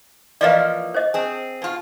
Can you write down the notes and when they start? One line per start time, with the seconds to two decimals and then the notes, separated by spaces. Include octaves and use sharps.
0.41 E3 F3 A#3 D5 D#5 F5
0.94 C5 D#5
1.14 C4 G#4
1.62 B2 F4